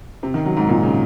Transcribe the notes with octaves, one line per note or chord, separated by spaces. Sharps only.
C3
D#3
F#3
G#2
A#2
C#3